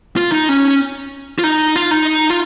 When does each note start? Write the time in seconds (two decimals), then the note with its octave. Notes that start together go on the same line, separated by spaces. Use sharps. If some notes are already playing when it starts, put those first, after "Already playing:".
0.17 F4
0.32 D#4
0.49 C#4
1.39 F4
1.44 D#4
1.76 F4
1.91 D#4
2.30 F4